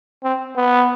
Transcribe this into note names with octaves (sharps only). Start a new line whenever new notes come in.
C4
B3